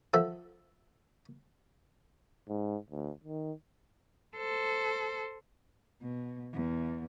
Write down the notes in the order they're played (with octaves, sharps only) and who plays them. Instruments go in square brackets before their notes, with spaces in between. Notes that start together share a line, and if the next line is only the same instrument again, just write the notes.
[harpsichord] F3 A4 E5 F#5
[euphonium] G#2
D2
D#3
[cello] A4 C5
B2
E2